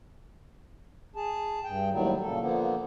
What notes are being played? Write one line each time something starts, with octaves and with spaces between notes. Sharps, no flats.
G#4 A5
G2 G5
D#2 A2 D#3 F#3 G3
A#2 C#3 A4
D3 F3 A#3 B3